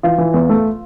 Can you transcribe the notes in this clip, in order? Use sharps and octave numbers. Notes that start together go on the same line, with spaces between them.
E3 F4
E3
E2
A3